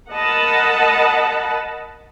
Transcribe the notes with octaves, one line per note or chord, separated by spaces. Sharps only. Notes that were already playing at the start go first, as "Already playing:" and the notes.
A#4 D#5 F#5 A5 B5